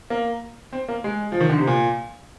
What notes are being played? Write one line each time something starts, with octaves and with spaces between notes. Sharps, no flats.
A#3
C4
A#3
G#3
F3
D#3
D3
C3
A#2